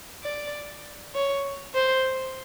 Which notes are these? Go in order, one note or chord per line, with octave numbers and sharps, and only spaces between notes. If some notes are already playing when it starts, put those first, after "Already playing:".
D5
C#5
C5